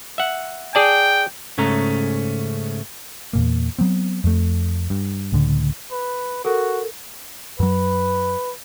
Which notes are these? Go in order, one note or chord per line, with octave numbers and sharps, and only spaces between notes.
E5 F#5
G#4 D5 G5 A5
G#2 C#3 A3 C#4 A#5
E2 A#2 A#3
F#3 B3 C4
F2 A3
G2
C#2 A2 D3
B4
F#4 A4 A#4
F#2 F#3 B4